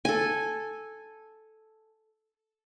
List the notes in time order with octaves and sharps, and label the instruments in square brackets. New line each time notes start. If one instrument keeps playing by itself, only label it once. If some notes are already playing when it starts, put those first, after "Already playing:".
[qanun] A4 G#5